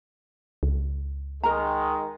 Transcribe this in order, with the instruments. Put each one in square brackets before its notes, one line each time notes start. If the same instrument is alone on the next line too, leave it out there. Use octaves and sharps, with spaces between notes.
[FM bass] C#2
[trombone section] D#3 G#3 [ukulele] A#4 A#5